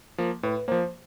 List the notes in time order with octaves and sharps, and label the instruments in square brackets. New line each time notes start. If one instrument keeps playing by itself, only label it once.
[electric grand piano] F3 A#3
[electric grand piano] A2 [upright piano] B4
[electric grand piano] F3 A#3 [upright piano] C5